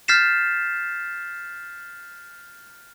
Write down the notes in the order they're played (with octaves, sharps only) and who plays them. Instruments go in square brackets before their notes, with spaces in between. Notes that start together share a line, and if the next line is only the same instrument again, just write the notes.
[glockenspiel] F6 G6 A6 B6 C7 E7